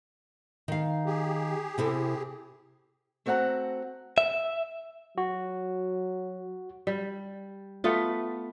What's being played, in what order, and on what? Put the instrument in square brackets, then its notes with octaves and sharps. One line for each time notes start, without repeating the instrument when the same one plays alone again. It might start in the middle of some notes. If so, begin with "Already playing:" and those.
[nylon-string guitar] D#3 F5
[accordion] G4 G#4
[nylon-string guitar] C3 E4 A4
[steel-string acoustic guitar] A3 C4 F#4 E5 F#5 A#5
[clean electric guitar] E5
[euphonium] F#3 [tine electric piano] F#4
[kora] G3
A3 B3 F4